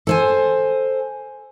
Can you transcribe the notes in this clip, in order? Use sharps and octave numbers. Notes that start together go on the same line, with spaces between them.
A4 C5 G#5